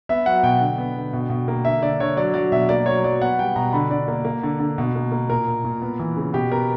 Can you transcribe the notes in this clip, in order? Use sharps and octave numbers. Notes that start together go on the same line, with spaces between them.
B3 E5
F#3 F#5
B2 G5
D3
B3
D3
B2
B2
A#3
D3 E5
D3 D5
D3 C#5
F#3 D5
F#3 D5
B2 E5
A#3 D5
F#3 C#5
F#3 D5
B3 F#5
G3 G5
B2 A#5
D3 B5
D3 D5
A#3
A#3
D3
D3
B2
A#3
A#3
A#2 A#4
A#2
A#2
B3
E3
C#3
B2 G4
B3 A#4